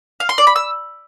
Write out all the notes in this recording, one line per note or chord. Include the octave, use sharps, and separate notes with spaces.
F5
C6
D5
B5
E6